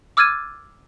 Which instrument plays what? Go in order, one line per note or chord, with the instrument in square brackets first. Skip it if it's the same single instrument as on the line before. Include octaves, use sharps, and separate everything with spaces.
[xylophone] D6 E6 F6 G#6 A6 D#7